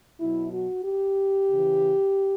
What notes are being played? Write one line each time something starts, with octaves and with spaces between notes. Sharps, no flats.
B2 F#3 E4
F#4
G4
C#3 E3